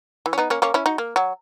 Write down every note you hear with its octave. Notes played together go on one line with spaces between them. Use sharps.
E3
C#4
B3 D#4
A#3 C#4
A#3 C#4
C#4 E4
D#4 F#4
A#3
F#3